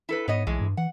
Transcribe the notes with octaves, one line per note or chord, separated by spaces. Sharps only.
E4 A4 B4
G#2 B3 C#5 D#5
B1 A2 E3 G#3
G2
E3 F#5